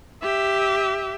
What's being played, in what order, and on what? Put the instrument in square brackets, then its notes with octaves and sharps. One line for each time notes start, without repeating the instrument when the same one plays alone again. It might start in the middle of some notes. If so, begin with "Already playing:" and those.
[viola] G4 E5